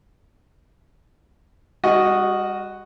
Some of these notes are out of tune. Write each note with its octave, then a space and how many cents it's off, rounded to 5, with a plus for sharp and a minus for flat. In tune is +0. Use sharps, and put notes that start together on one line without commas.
G3 +40 F#4 +0 D#5 -5